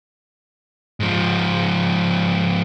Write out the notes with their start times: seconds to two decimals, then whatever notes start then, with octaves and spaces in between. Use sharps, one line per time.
1.00 G#2 F3